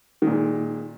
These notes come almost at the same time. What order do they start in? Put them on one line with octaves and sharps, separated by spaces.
D#3 A#2 G#3